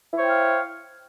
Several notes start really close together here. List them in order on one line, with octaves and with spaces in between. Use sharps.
E4 C#5 C5 G5 F5